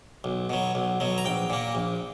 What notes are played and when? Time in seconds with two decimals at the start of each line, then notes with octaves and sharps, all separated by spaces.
0.24 B1
0.50 B2 F#3
0.75 B1
1.00 B2 F#3
1.18 A#5
1.25 A#1 G5
1.50 A#2 A#3
1.75 A#1